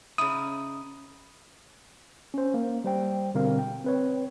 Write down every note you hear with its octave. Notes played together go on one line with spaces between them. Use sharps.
C#3 D#4 E4 D#6
C#4 C5
A#3
G3 C5 G5
B2 D3 G3 C4 A#4 F5
G5
C4 B4 C#5